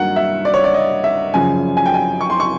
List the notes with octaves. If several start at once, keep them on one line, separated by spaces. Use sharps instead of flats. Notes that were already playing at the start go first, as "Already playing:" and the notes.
Already playing: G2 D#3 F#3 A#3 F#5
E5
D5
C#5
D5
D#5
E5
F#2 C#3 F3 G#5
G#5
G5
G#5
C#6
C6
C#6